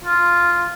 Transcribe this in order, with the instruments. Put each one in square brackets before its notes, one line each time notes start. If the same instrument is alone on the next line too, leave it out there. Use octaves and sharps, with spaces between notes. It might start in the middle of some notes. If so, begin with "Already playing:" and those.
[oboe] F4